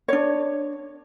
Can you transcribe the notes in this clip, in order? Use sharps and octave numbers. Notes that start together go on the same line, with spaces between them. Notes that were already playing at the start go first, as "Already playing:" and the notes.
D4 C#5